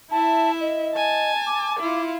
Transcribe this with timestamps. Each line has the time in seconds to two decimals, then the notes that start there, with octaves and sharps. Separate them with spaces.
0.11 E4 E5 A5
0.61 D#5
0.95 G#5 A5
1.47 D6
1.80 E4 F4